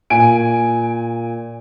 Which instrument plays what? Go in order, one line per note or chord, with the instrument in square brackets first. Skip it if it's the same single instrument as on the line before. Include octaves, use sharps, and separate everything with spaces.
[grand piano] A#2 G#5 D7